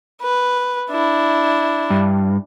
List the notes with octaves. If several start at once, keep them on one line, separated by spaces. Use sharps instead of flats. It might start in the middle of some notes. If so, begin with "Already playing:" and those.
B4
D4 E4
G2